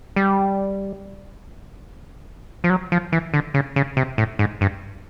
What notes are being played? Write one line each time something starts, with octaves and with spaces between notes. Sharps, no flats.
G3
F3
F#3
F3
E3
D3
C#3
C#3
C3
A2
G#2
G2